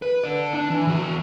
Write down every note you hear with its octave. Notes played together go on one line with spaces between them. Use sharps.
B4
D3 D5
D4
E3
E2 F#4